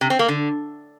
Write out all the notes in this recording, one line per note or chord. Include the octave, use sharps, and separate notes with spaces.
C3
C4
A#3
D3